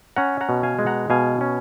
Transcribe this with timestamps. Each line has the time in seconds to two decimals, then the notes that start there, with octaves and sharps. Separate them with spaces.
0.16 C#4 F#5 A#5
0.41 F#5 A#5
0.49 B2
0.63 F5 G#5
0.79 G#3
0.86 F#5 A#5
1.10 B2 F5 G#5
1.41 C#4